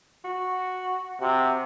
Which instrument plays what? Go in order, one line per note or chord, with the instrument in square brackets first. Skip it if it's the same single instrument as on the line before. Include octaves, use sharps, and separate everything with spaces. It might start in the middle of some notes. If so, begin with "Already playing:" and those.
[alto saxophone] F#4
[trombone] C3 [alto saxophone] F#4